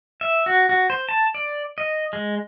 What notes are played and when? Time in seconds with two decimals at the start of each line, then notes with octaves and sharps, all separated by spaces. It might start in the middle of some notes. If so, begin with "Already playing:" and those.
0.21 E5
0.46 F#4
0.69 F#4
0.90 C5
1.09 A5
1.34 D5
1.78 D#5
2.13 G#3